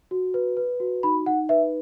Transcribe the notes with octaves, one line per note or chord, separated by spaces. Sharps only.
F#4
B4
B4
F#4
D#4 B5
D#4 F#5
B4 E5